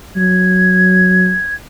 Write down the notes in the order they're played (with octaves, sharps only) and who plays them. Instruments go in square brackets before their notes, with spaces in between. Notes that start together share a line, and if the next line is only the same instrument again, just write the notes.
[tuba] F#3 [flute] G#6